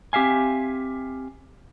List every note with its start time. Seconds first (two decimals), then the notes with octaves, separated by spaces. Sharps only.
0.13 C4 G4 E5 F5 G#5